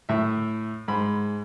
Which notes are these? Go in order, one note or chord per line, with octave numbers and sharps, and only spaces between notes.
A2 E5
G#2 B5